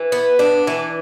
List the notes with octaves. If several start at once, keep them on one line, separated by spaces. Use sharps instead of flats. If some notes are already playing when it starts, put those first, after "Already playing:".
Already playing: E3
B3
D4
E3